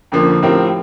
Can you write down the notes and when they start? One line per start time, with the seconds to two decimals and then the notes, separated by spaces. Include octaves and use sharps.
0.12 F2 D3 F3 A#3
0.42 A2 F3 C4 G4 A#4